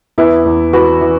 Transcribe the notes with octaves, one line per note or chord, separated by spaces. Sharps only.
E2 B3 E4
E2
E3 F#4 B4
E3